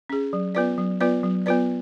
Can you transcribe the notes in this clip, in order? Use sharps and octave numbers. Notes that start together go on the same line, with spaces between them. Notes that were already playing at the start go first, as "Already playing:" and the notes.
C#4 G#4
F#3
B3 F4 B4 D5
F#3
B3 F4 B4 D5
F#3
B3 F4 B4 D5